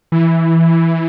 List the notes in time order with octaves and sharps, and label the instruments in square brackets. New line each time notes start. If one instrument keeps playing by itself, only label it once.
[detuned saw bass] E3